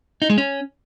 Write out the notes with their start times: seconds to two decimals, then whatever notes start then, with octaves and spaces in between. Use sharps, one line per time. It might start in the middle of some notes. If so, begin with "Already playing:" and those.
0.22 D#4
0.30 G#3
0.38 C#4